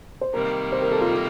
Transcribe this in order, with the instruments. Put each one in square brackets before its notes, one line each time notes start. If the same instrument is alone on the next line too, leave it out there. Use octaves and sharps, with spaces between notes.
[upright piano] C5
[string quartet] C3 D#3 G3 A#3 [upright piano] A#4
[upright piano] C5
A#4
A4
F4
A4